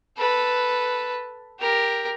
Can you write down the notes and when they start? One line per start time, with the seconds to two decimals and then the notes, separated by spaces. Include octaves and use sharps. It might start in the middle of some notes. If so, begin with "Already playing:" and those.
0.17 A4 B4
1.59 G4 A#4